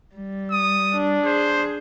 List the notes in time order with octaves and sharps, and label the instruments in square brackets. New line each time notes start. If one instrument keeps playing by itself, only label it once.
[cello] G3
[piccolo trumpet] D#6
[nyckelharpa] D4
[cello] G#4 [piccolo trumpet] C5